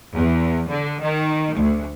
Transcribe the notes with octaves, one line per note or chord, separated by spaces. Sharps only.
E2
D3
D#3
D2